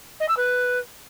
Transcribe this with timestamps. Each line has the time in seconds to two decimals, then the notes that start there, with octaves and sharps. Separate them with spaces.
0.20 D#5
0.28 E6
0.37 B4